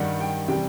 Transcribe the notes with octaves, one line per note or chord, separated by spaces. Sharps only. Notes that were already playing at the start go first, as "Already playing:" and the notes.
Already playing: G2 D#3 G3 F#5
G5
C3 E3 G3 G5